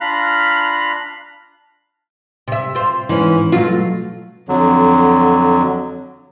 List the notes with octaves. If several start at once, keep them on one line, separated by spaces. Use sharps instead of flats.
D4 F4 F5 A#5 B5 F#6
C3 E5
F4 C5
G#2 E3 C#4
B2 F#3 A3 F4
F2 D3 F#3